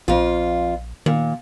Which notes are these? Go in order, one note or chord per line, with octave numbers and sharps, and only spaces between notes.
A#1 F2 F4
A#2 D#3